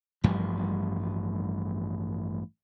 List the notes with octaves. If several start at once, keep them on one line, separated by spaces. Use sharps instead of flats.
A1 G2 F3 G3